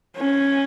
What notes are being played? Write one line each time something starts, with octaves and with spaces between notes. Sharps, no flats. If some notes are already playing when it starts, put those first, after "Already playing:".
C#4